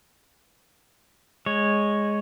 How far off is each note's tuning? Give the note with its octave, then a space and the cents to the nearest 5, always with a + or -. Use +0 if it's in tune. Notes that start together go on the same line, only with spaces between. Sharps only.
G#3 +0 C#5 -5